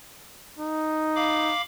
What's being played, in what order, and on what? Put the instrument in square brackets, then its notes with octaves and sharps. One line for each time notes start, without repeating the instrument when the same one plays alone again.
[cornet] D#4
[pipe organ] F5 B5 D6